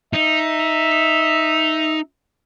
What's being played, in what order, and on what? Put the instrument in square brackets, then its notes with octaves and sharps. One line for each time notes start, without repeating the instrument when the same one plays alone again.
[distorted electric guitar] D#4 [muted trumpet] E5